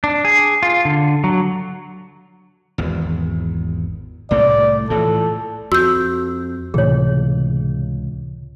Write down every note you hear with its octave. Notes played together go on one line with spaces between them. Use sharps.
D4
G#4
F4
D3
F#3
G#1 E2
C2 A2 A3 D5
A2 E3 F3 A4
F2 F#4 E6 G6
C#2 A2 C3 E3 G#4 C#5